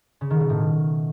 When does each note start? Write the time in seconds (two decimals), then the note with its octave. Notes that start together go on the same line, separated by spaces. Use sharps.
0.21 C#3
0.30 D#3
0.40 B2
0.49 A2
0.59 B2